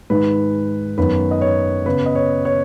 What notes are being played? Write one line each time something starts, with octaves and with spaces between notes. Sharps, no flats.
G#2 D#3 G#3 B4
F#2 D#3 B3 B4
D#5
C#5
C#3 B3 B4
D#5
C#5
C#5